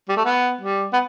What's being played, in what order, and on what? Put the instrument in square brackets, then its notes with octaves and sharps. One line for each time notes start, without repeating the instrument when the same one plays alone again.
[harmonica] G3
A3
B3
G3
B3